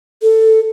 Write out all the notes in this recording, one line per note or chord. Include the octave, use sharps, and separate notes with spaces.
A4